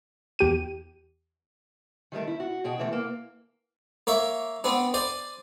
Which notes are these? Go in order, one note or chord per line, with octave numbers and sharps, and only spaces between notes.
E2 G4 D#7
D#3 G3 A3 A#4
E4
F#4
B2 G#4 G5
C3 E3 G3 A3
A#3
A#3 C#5 E5
B3 C4 D4
C5 D5 G#5